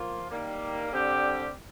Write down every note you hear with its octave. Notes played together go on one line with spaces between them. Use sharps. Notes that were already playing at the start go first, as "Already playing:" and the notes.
Already playing: F3 A#3 F4
D#3 G3 A#3
D3 G3 C4 G4